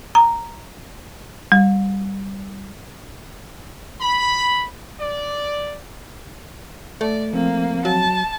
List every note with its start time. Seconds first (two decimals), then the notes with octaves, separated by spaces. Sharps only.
0.15 A#5
1.52 G3
4.01 B5
5.00 D5
7.01 A3 D5
7.33 F3 A#3 C4
7.85 F#3 A5